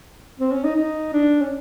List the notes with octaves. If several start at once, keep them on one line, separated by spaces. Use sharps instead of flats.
C4
C#4
D#4
D#4
D4
C#4